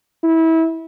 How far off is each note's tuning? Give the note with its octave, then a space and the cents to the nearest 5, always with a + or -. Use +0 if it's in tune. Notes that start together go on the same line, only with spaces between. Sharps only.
E4 -25